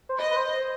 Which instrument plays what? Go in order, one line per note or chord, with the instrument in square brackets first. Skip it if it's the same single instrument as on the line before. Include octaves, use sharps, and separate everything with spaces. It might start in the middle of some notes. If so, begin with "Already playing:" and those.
[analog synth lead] C5
[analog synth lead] B4 [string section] D#5
[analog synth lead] B4
C5
C5